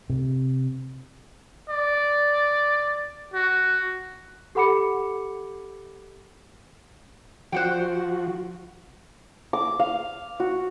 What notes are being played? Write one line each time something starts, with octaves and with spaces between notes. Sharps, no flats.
C3
D5
F#4
G4 A4 F#5 B5 D6 C#7
F3 F#4 C5 F#5 G5
D6
F5
F#4